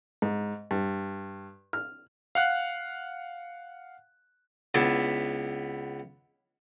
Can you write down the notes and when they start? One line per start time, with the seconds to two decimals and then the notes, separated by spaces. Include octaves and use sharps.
0.22 G#2
0.71 G2
1.73 F6
2.35 F5 F#5 F#6
4.74 C#2 B3 D4 E4